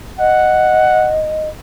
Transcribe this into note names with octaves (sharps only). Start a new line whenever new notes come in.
D#5 F#5